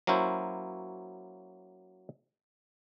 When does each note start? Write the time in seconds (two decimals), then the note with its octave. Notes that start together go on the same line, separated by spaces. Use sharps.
0.07 F#3 A#3 C#4 E4 C5